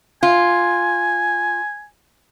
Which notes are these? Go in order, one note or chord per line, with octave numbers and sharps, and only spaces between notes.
F4 G#5